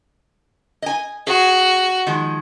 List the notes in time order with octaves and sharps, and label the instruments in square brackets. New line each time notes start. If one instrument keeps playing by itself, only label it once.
[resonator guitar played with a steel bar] D#5 G#5
[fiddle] F#4 [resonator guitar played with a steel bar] G#4
[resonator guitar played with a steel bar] D#3 F3 G#3